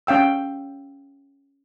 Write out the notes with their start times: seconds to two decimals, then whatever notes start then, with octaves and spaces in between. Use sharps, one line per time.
0.07 C#4 F5 G5 E6